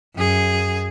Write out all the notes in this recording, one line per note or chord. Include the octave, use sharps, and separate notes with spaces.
F#2 G#4